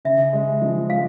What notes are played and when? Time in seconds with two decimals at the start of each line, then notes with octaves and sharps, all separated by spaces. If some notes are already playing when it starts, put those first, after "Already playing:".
0.05 C#3 E5
0.33 G#3
0.62 F3
0.90 G#3 F5